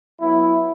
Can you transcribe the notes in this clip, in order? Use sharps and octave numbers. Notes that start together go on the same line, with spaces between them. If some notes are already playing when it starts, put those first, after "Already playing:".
F#3 B3 E4